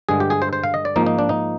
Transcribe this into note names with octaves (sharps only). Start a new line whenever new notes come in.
G2 D3 G#3 G#4
G4
G#4
C5
C5
F5
D#5
D5
G#2 F3 A#3 D#4
D#4
D4
D#4